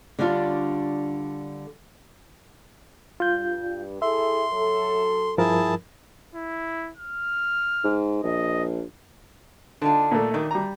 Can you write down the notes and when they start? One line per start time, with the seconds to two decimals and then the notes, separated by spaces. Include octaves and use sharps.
0.19 D3 G3 C#4 D4 F4
3.20 G2 F4 G6
4.02 E4 G#4 A4 E5 C6
4.52 F#3 A4
5.38 G2 F3 E4 G#4 A#4 A5
6.35 E4
6.97 F6
7.84 G#2
8.23 A#1 D#5
9.82 D3 D4 D#4 F4
10.11 A#2 A3
10.34 A#2 D#3 E3 D4
10.51 G3 A#5